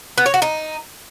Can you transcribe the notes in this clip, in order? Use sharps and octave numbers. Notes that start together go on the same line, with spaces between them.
B3
C#5
F#4
D#4